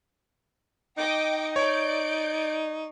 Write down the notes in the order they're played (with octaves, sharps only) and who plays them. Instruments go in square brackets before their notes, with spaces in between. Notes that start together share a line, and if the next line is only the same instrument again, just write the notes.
[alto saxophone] D#4 [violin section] D#5 G5 D6
[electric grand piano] C#5 [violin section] D5 G6 D7